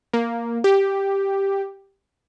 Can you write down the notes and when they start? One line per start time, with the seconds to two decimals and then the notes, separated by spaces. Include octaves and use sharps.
0.14 A#3
0.64 G4